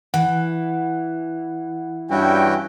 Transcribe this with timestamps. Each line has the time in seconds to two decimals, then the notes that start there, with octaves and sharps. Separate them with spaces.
0.14 E3 F#5
2.10 G2 C#4 E4 F#4 G5